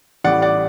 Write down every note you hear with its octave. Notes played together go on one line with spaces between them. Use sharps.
A1 A2 G3 D5 F#5
D5 F#5